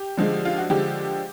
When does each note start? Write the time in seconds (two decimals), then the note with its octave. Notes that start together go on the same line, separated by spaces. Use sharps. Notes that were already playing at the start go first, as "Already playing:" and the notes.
Already playing: G4
0.17 D3 F3 G#3
0.45 F4
0.58 F#4
0.70 D3 F3 G#3 G4